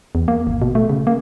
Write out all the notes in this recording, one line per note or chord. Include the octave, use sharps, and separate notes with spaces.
E2
A#3
G#1
B2
A3
C#3
A#3